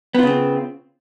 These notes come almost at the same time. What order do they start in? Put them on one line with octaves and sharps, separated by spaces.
B3 F4 C#3 C4